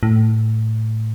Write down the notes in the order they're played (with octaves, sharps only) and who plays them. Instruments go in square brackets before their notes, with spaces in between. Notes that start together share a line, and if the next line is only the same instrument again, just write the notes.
[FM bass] A2